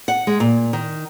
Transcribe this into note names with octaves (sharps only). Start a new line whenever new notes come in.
F#5
G#3
A#2
D#3